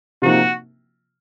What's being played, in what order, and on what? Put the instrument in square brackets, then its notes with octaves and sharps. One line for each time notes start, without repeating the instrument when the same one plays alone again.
[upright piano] C3 F3 A#3 D#4 [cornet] F#4